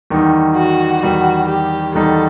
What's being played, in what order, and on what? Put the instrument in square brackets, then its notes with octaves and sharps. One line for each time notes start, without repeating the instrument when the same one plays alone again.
[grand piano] E2 D#3 G3 D#4
[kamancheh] F#4
[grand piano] E2 D#3 G3 D#4 [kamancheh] F#4
[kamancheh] G4
[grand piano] E2 D#3 G3 D#4 [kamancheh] A4